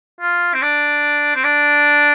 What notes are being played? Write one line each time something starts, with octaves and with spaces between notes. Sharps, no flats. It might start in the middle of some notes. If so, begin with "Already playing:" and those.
F4
C4
D4
C4
D4